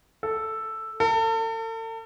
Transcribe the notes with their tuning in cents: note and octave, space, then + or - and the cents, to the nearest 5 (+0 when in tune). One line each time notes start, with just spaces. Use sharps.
A4 +0
A4 +40